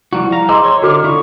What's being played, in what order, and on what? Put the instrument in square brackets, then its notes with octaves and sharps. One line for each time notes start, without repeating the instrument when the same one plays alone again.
[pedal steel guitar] F3 G3 F#4 [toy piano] E4
[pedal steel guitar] F5 A#5
[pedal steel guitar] G#4 C5 E6 [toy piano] D#5 A#5 D6 [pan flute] C6
[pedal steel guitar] C#5
[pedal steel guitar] D3 [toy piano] F#4 A4 D6 [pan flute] F6
[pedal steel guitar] E4 F4 [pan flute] C#6